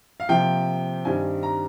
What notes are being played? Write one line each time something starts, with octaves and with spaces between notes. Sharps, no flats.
F5
C3 F3 A#3 G5
G2 D#3 G3 C4 D#4 G#5
A#5